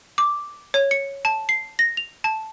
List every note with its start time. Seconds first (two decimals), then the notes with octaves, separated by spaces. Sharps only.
0.18 D6
0.74 C#5
0.91 C#7
1.25 A5
1.49 C7
1.79 A#6
1.97 F7
2.24 A5